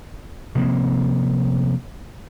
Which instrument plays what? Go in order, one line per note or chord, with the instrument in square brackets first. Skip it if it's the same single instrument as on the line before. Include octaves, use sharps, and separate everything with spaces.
[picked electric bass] C3 F3 A#3 C4